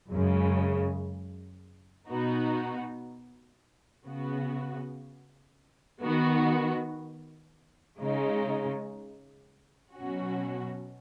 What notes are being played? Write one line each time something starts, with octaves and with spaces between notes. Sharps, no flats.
F#2 C#3 G#3
B2 B3 D#4 F#4
C#3 B3 F#4
D#3 B3 F#4
C#3 G#3 D#4
B2 F#3 C#4 F#4